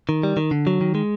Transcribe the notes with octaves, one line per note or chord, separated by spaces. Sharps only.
D#3
G3
D#3
D3
F#3
D#3
G#3